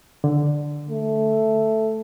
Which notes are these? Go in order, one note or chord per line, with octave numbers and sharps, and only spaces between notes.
D3
A3